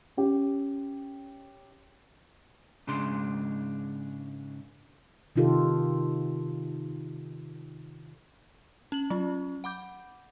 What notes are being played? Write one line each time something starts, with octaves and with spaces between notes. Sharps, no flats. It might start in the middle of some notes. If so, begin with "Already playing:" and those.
C#4 G4
G#2 C#3 G#3 D4 C6
C3 D#3 D#4 F4 G4 A4
C#4 F#7
F#3 C#4 F4
F#5 B5 D6 G6